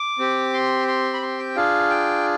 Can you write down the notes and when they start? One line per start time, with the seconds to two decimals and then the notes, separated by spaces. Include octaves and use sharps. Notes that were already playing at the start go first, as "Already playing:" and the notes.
Already playing: D6
0.19 C4 G4
0.54 C6
0.88 C6
1.14 B5
1.22 C6
1.39 G5
1.56 D4 F4 G#4 F5
1.90 G5